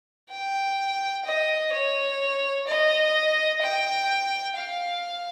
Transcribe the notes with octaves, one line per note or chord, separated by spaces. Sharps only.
G5
D#5
C#5
D#5
G5
F5